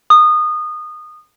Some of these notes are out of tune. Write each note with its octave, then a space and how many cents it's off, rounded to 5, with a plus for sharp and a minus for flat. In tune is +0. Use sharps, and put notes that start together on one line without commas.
D#6 -25